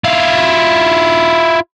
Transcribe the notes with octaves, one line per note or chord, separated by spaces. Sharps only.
E4 F4